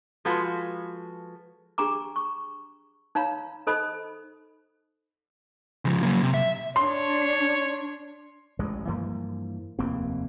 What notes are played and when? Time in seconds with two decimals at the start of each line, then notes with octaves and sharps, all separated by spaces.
0.25 F3 G#3 F4 F#4 A4 B4
1.78 D4 G4 G#4 A#5 C6 D6
2.16 C#6
3.15 D#4 C#5 F5 A#5 B5
3.67 D#4 A4 C5 D#5 B5
5.85 C#3 F3
6.03 F#3 A#3
6.22 C3
6.34 E5
6.76 D4 C#5 C6
8.59 A1 G2 G#3
8.87 G2 E3 F3 A#3
9.79 F1 D#2 A#3 C4